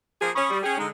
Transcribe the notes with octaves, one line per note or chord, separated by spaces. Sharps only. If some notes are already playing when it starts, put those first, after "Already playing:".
F3 A#3 G#4
C#4 B5 C#6 D#6
G3
C#4 G#4 G5 G#5
D3 G#3 D#4